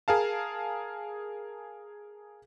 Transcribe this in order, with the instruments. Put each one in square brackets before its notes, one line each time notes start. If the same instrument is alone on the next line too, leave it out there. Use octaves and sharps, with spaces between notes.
[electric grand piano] G#4 A#4 F5 A5